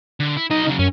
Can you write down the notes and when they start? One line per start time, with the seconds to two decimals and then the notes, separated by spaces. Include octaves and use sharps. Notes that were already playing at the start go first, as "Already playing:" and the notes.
0.20 D3
0.37 E4
0.50 F#3 D#4 D#5
0.66 C#3 F#3
0.79 F#2 C#4